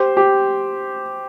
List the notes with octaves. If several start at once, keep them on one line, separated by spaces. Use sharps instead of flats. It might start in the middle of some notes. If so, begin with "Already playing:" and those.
Already playing: G4 C5
G4